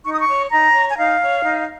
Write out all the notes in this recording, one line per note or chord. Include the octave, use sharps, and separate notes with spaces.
D#4 C#6
D#6
C#6
C#5
D#4 A#5
C#5
G#5
D#4 F5
C#5
D#4